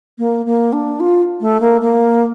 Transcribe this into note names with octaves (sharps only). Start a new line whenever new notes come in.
A#3
A#3
D4
F4
A3
A#3
A#3